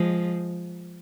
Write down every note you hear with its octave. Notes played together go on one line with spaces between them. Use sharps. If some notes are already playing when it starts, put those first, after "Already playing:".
Already playing: F3 G#3